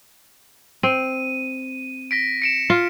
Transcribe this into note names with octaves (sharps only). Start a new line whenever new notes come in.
C4 D#7
A#6 B6 D7
C#7 D7 E7
F4